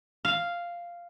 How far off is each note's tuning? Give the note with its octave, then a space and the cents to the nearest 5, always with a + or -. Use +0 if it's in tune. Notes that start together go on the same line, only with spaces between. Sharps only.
F5 -5